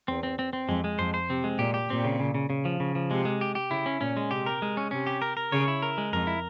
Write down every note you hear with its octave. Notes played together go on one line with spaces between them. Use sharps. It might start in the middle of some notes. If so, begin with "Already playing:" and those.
E2 C4
C4
C4
C4
F2 G#3
G#3
F2 C5
C5
C3 C4
G#3
A#2 G4
G4
A#2 C4
C#3
C#3
C#3
C#3
F3
C#3
F3
C3 G#3
G#3
G4
G4
C#3 E4
C#4
A#2 C#4
G#3
C3 G4
A#4
G#3
C#4
C3 C#4
G4
A#4
A#4
C#3 C#5
E4
A#4
G#3
F2 A#4
E4